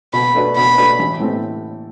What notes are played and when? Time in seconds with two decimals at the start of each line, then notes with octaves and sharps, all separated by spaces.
0.13 B2 B5
0.35 A3 D4 F#4 B4
0.57 B2 B5
0.78 A3 D4 F#4 B4
0.99 A1
1.20 A2 E3 A3 C4